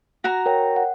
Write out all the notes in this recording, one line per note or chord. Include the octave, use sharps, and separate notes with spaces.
F#4 A#5
A#4 C#5 G5
F#5